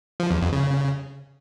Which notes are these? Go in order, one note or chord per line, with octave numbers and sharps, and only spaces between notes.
F3
E2
F2
C#3